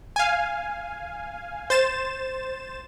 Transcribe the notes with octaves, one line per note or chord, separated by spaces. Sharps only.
F5 G#5
C5 A6 E7